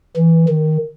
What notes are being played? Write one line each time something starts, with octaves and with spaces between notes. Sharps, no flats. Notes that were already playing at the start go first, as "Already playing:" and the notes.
E3
D#3